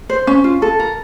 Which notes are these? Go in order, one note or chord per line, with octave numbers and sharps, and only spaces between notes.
C5
C#4
F4
A4
A#4